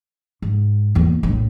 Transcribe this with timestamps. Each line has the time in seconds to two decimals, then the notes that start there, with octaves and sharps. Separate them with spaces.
0.42 G#2
0.95 E2 A#3
1.23 A#1 A2